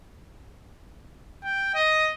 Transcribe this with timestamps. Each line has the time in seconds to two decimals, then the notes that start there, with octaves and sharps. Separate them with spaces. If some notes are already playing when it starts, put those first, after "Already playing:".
1.44 G5
1.75 D#5